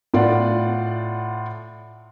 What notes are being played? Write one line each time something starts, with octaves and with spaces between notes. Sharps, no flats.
A2 F4 D5 F#5